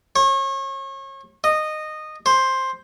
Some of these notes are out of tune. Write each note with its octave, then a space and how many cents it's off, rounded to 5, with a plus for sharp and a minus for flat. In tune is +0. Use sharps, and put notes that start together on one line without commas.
C#5 -35
D#5 -15
C5 +10